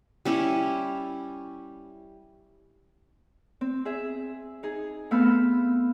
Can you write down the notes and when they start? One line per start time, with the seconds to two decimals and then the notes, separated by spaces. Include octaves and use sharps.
0.25 G3 C#4 E4 G4
3.61 C4
3.85 G#4 E5
4.63 D#4 G#4
5.11 A3 B3 C4 F5 B5 E6